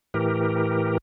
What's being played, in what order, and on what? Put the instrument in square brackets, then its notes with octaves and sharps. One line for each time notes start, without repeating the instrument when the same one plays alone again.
[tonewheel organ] A2 E3 G4 A#4